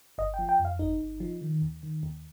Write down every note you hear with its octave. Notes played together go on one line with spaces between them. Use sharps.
G1 D#5
G5
F3
G5
F2
F5
G1 D#4
G1
F3
D#3
D#2
D#3
D#2